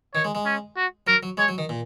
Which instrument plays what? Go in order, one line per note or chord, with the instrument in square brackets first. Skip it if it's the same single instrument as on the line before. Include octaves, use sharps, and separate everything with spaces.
[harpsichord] D#3 [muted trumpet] C#5
[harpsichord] G#3
G#3
[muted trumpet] C#4
F#4
[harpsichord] F#3 [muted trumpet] A#4
[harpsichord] F#3
[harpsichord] G#3 [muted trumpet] C#5
[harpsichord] F#3
D#3
A#2